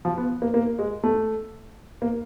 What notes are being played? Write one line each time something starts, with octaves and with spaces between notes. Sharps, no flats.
F3
B3
A#3
A#3
G#3
A3
A#3